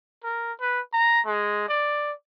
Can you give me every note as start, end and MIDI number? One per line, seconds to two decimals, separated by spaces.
0.24 0.52 70
0.61 0.80 71
0.93 1.20 82
1.26 1.68 56
1.69 2.13 74